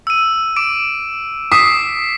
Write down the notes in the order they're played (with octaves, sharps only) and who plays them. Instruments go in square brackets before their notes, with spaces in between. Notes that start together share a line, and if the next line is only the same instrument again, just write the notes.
[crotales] E6 D#7
D6 D7
[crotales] D6 B6 C7 [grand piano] D#6